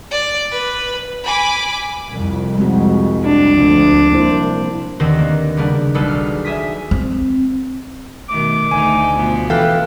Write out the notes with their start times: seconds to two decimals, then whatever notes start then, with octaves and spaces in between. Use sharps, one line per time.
0.11 D5
0.51 B4
1.25 G#5 B5 D6
2.11 C2 F2
2.58 G#3 C4 F#4
3.25 D4
3.56 D2 F3
4.12 C2 A#3 E4 C5
5.00 D#2 D3 D#3 C4 B4 A#6
5.18 A#3
5.57 C#3 G3 A#3 B3 D4
5.94 B1 G3 G#4 A4 B4
6.08 F6
6.45 E5 G#5 D#6 B6
6.91 C4
8.29 B2 D#3 A3 D6
8.71 D2 A3 D#4 G#5
9.13 B2 F3 B3
9.50 E3 A4 B4 F5 G5